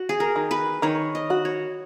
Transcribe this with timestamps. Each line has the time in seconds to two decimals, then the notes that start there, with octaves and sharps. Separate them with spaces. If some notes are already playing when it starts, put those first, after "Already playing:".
Already playing: F#4
0.09 G#4
0.20 A#4
0.36 D#3
0.51 B4
0.82 D#3 C#5
1.15 D#5
1.30 F#4
1.45 C#5